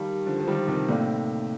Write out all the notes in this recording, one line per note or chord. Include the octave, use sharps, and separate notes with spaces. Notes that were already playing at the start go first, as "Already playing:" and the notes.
Already playing: D#3 G3 G4 A#4 F5 A5
D3 F3
F3
D#3 G3
C3 D#3
A2 C3 A#3 D#4 A4 D5 F5